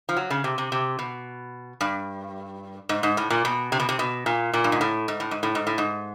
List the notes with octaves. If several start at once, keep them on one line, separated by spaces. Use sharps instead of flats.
F3
F#3
C#3
C3
C3
C3
B2
G2
G#2
G#2
A2
A#2
B2
C3
B2
C3
B2
A#2
A#2
G2
G#2
A2
G#2
A2
G#2
A2
G#2
A2
G#2